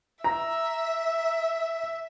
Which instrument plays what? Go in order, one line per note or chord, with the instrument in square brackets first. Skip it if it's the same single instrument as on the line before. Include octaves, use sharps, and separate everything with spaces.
[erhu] E5 [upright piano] A#5